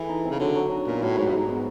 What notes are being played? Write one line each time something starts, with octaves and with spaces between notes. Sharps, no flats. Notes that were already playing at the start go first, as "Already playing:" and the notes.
Already playing: E3 A3 G#4
D#4
C4
C#3
D3 F#3
F#3
D#4
A#2 B3
A2 F#3
G#2 F#3
G2
G#2 D#4
B3